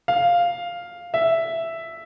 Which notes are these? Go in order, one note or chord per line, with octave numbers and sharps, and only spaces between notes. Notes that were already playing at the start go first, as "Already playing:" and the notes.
F5
E5